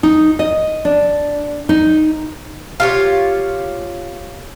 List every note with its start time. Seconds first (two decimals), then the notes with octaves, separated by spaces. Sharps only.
0.03 D#4
0.39 D#5
0.85 D4
1.69 D#4
2.80 F4 G4 C#5